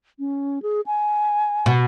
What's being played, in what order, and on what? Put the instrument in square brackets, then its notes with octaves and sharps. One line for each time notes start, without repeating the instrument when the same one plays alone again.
[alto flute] C#4
G#4
G#5
[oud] B2